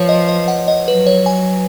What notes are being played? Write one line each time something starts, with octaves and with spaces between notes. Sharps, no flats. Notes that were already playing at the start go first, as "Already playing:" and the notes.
Already playing: F3 B4 C#5
D#5
D#5
F#5
D#5
F#3 B4
C#5
G#5